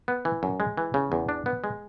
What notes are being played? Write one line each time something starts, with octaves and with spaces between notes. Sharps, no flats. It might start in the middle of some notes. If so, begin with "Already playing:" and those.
B3
E3
F#2
G#3
E3
C#3
E2
D4
B3
G#3